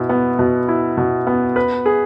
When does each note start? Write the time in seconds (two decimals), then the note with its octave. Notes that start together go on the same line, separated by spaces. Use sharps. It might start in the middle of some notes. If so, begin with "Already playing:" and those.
Already playing: B2 E4
0.09 B3
0.39 B2
0.69 E4
0.97 B2
1.27 B3
1.56 B4
1.86 G#4